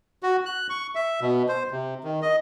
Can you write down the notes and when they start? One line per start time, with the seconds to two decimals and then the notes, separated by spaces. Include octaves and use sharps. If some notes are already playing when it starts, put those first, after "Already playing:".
0.23 F#4
0.46 F#6
0.70 C#6
0.95 E5
1.21 B2
1.48 C5
1.71 C3
2.04 D#3
2.22 D#5